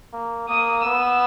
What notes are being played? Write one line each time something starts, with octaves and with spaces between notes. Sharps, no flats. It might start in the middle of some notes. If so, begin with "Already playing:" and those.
A#3
A#3 D#6
B3 E6